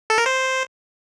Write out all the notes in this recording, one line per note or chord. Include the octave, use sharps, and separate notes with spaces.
A4
A#4
C5